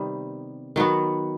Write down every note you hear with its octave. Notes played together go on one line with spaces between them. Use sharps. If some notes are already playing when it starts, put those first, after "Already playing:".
Already playing: C3 D#3 G3 B3
D#3 F#3 B3 F#4